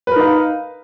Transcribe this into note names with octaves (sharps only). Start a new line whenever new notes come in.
D#4 A#4 B4 F5